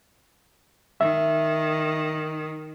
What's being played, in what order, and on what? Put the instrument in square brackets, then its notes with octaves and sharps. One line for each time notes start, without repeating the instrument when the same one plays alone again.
[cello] D#3 [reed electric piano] E5